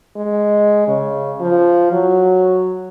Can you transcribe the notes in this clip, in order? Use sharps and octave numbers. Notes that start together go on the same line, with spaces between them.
G#3
C#3
F3
F#3